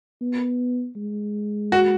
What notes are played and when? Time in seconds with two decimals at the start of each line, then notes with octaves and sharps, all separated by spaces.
0.22 B3
0.96 G#3
1.72 F#4